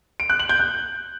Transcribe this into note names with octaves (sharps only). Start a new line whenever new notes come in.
D7
F#6
F#7
G6
F#6